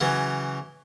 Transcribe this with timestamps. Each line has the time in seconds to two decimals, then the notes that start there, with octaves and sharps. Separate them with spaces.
0.01 C#3 E3 F#3